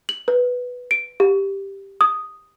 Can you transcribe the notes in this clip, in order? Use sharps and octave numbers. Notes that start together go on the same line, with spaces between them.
F#7
B4
D7
G4
D#6